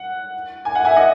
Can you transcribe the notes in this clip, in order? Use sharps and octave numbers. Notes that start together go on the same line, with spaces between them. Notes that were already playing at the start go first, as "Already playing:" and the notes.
Already playing: F#5
G#5
F#5
E5 G#5
D#5 F#5